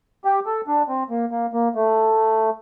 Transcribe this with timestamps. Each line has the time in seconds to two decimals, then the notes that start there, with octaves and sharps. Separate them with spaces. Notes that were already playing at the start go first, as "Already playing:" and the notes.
0.25 G4
0.46 A4
0.67 D4
0.89 C4
1.10 A#3
1.31 A#3
1.54 A#3
1.75 A3